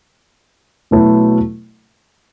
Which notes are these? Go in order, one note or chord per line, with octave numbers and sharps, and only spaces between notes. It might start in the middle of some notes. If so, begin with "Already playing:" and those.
B2 F#3 A3 E4 B4